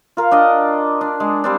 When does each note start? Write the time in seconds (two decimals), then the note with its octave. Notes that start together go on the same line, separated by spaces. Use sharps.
0.17 F4 A#4
0.31 D4 D5 D#5
1.01 D4
1.20 G#3
1.44 G3 C4 D4